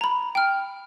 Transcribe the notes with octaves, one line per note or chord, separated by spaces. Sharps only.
A#5 B5
G5 F6